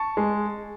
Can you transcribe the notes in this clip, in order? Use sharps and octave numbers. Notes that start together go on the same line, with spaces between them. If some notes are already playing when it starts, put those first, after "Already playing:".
Already playing: A5 C#6
G#3